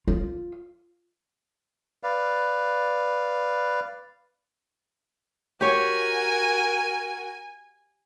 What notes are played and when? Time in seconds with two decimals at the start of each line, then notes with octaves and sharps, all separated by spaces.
0.08 F4
2.03 B4 D5 F5
5.61 F#4 G4 A#4 C#5 G#5